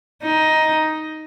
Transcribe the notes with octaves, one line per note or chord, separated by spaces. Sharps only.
D#4